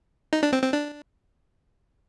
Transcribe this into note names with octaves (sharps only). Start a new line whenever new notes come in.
D#4
D4
C4
C4
D4